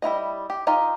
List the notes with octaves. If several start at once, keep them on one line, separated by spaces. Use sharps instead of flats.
G3 E4 F4 D#5
G4
D#4 F4 G4 D#5